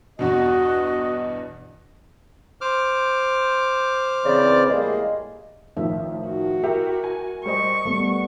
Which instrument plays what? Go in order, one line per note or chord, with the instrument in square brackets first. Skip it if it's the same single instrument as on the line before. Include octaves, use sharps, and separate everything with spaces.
[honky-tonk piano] E2 G2 B2 [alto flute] F#4 [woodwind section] D#5
[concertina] C5 D6 F6
[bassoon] C#3 [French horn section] E3 C4 D5
[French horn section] A2 G3 A#3 [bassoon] G#3
[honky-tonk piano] A1 D#3 F3 [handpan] E5
[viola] F#4
[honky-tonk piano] E4 G4 E5 [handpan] A#4
[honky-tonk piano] G#5
[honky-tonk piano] G3 C5 D#5 [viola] C#6
[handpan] G3 B3 [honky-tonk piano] A3